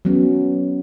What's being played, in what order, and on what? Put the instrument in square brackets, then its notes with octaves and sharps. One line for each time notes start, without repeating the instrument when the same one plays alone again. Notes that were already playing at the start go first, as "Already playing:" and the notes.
[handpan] F#3 B3 C#4